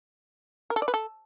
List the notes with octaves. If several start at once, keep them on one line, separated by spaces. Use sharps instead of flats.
A#4
A4
D5
B4
A4